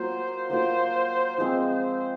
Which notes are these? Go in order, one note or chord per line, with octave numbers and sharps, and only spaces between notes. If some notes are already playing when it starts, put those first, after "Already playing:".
Already playing: F#3 A#3 F4 C5
F#3 A#3 F4 A#4 C5
F3 G#3 C4 C5
C5